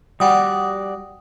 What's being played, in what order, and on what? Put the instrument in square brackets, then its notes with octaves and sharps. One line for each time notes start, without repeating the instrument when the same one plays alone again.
[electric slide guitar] G3 F#4 D5 [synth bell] F#5 G5 D#6